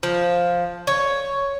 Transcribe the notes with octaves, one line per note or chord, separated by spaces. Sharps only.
F3
C#5